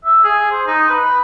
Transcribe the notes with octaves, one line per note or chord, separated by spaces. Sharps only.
E5
G#4
C5
D#4
B4